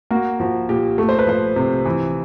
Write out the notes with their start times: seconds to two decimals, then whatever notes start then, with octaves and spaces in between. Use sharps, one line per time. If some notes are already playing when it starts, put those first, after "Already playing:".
0.11 A#3 F#4
0.40 F3 F#4
0.69 A#2 G4
0.98 A3
1.09 C5
1.19 B4
1.27 F3 C5
1.56 C3
1.85 E3